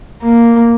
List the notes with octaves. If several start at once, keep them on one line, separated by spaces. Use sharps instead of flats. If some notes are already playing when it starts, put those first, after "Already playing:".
A#3